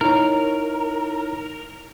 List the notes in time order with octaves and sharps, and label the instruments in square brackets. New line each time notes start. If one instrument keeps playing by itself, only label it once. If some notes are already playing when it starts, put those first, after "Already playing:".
[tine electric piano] D#4 E4 C#5 [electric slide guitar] A#4